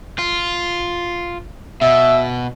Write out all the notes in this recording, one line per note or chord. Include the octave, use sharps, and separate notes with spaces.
F4
B2 E5